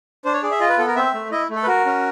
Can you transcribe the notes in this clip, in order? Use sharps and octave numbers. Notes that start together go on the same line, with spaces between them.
D4 C5
C#5
G#4 D5
E5
F4 D#5
B4
B3 A4
A#4
C4 E5
A3
E4 D#5
A3
A4
B4
F#4 A#4
C#4